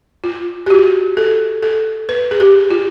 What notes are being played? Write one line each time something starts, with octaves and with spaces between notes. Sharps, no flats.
F4
G4
F#4
A4
A4
B4
G#4
G4
F4